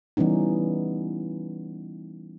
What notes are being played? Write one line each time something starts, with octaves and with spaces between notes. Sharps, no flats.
E3 G3 B3 C#4 D#4